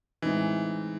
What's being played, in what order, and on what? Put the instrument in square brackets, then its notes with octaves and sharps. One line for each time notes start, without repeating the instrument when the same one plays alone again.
[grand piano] A2 G#3 C4 D#4 [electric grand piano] E3